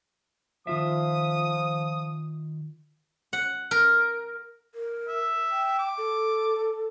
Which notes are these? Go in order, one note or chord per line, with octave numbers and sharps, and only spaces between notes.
D#3 F3 F4 E5 D#6
F#5
A#4
A#4
E5
G5
D6
A4